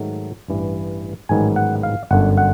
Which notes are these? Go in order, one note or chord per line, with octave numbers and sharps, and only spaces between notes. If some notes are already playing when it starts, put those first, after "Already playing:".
Already playing: G#2 D#3 F#3 A3
A1 G2 E3
A1 G#2 D#3 F#3 B3 G#5
F#5
F5
G1 F#2 D3 F#5
F#5